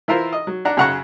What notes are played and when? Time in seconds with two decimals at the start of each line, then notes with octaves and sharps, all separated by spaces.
0.08 E3 E4 F4 A#4 C5
0.33 D#5
0.47 F#3
0.65 D4 F#5 A#5 F#6
0.77 F#2 C#3 F#5 A#5 C#6